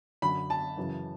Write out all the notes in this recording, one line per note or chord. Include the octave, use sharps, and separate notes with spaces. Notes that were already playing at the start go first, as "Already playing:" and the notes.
F#2 D3 B5
A5
F#2 C#3 E3